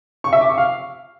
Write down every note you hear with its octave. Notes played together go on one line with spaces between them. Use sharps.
C#6
E5
D6
C#6
F5